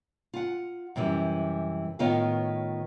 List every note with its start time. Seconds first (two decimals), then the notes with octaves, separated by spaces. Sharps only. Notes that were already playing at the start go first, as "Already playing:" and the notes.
0.33 F4 F#5
0.96 F#2 C3 E3 G3
1.99 A2 D#3 B3 F4 C#5 F5